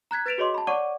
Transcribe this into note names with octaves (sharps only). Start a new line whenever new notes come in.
A#5 F#6 G#6 B6
B4 A6 B6 D7 E7 F7
F#4 G#4 C#5 D#5 C6 D6
A5 B5
C#5 D5 F#5 C#6 D6 D#7